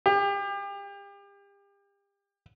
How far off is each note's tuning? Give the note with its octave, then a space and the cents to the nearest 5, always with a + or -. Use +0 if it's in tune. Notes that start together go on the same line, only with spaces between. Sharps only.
G4 +35